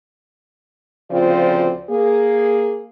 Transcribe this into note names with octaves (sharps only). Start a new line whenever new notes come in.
D2 C#3 F3 C4 F4 D5
A#3 G#4